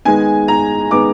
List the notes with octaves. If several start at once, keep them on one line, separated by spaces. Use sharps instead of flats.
D#3 G#3 B3 G#5
A#5
D#3 G#3 B3 D6